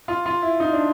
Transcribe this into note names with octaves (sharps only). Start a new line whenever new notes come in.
F4
F4
E4
D#4
D4